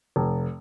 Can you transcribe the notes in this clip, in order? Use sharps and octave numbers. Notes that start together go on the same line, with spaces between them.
F1